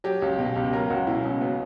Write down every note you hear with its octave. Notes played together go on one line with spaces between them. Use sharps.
F#3 G4
C#2
B2
C#2 G4
F#3 A#4
C#2 F#4
B2 E4
C#2 C#4
F#3 B3